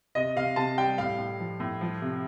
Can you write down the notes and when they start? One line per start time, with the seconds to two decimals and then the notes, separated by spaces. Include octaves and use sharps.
0.15 C3 D#5
0.36 C3 F5
0.56 C3 A5
0.78 G3 G5
0.98 A2 F5
1.19 A2
1.40 F3
1.60 A2
1.81 F3
2.02 C3